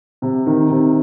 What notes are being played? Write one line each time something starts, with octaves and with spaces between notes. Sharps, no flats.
C3
D#3
C3